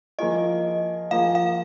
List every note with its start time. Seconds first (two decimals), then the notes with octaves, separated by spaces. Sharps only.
0.19 F3 A#3 F4 G#4 D#5
1.11 F3 A#3 F4 G#4 F5
1.35 F5